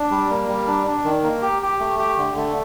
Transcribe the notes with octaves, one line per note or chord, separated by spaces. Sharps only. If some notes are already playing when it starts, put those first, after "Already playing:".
Already playing: D4
G3
A#3
G3
D4
D4
D#3
A#3
G4
G4
A3
G4
D3
A3